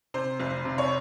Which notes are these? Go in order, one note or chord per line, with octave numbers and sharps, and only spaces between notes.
C3 C5
F1 C5
C3
C#5